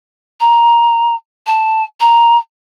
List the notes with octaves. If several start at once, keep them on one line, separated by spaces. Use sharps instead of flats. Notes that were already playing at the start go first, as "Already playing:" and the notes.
A#5
A5
A#5